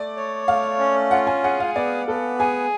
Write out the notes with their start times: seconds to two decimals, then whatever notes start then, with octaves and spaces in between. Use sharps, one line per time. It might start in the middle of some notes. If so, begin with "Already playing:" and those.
Already playing: A3 D5
0.16 C#5
0.47 A3 F5
0.79 C#4
1.11 F4 F#5
1.27 G#5
1.43 G#4 F#5
1.60 F5
1.76 B3 D5
2.08 B3 A4
2.39 G#4 G#5